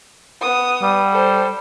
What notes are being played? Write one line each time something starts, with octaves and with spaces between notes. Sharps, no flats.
B3 D#6
G3
A4 C5